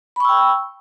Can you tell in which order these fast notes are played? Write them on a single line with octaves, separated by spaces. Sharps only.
B5 C#6 E6 G5